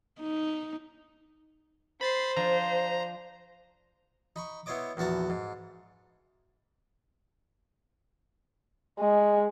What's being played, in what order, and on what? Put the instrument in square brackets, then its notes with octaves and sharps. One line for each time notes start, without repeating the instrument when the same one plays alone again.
[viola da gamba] D#4
[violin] C5 [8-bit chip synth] B5 A6 C7
[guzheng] F3 D4 [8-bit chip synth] A#5
[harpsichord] D#4 B5 C#6
B3 E4 C5 C#5 D#5 D6
A#1 E2 F#4 A5 A#5
G#2
[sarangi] G#3